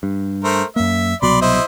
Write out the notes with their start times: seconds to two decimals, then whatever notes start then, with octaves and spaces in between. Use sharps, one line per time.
0.03 G2
0.44 A3 A#4 C5
0.76 F#2 A#3 E5
1.22 C2 B2 F#3 D5 B5 C6
1.41 E4 C5 D#5